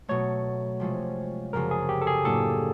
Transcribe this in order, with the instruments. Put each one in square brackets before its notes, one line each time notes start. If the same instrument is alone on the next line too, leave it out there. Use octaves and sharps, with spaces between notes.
[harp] B2 F#3 A3 [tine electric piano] C#5
[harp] C3 F3 G#3 C#4
[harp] F#2 C#3 F3 [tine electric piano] A#4
[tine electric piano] G#4
G4
A4
G#4
[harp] A2 F#3 A#3 D4 [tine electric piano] A4